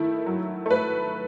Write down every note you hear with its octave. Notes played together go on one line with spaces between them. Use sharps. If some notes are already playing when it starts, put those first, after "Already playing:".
Already playing: D#3 A3 E4
F#3
A3 B4